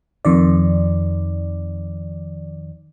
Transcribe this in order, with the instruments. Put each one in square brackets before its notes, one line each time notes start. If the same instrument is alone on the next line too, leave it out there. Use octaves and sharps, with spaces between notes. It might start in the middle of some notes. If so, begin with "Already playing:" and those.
[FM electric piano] F2 D#3 D5